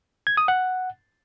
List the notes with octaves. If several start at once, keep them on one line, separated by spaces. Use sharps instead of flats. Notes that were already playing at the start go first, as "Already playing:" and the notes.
G#6
D#6
F#5